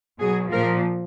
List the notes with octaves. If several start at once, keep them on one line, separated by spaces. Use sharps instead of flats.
B2 F#3 G#4
A#2 F3 A#4